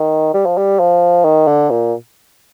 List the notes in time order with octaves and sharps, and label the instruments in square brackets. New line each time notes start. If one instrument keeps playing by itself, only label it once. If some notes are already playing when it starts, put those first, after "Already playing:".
Already playing: [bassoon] D#3
G3
F3
G3
F3
D#3
D3
A#2